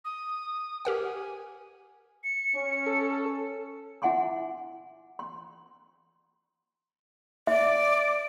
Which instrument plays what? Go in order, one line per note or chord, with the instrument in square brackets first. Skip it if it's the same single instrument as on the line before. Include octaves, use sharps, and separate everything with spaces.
[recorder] D#6
[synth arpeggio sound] G4 A#4 F#5 [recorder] G#5
[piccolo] C#7
[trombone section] C#4
[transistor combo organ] A4
[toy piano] E4 E5 F#5 G#5 C6 D6
C6
[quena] D5 [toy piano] E5